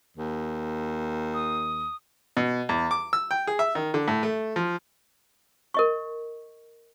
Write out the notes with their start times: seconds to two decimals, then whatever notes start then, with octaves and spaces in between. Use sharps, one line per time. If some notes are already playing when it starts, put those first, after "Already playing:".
0.17 D#2
1.34 D#6
2.37 B2
2.69 E2
2.91 D6
3.13 E6
3.31 G5
3.47 G#4
3.59 E5
3.75 D#3
3.94 D3
4.08 A2
4.23 A3
4.56 F3
5.74 A#4 D#5 C#6